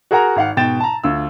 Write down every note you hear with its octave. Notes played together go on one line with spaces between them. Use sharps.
F#4 G#4 A#4 F#5 A#5
G#1 F5 F#5
G#2 B2 G5 A6 E7
A5 A#5
D2 F4 E6